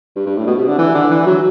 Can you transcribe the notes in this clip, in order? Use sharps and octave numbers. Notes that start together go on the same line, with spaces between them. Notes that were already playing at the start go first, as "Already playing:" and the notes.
G2
G2
A2
B2
C3
D3
E3
D3
E3
F#3